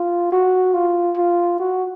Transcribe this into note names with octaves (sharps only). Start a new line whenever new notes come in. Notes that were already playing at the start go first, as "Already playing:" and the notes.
Already playing: F4
F#4
F4
F4
F#4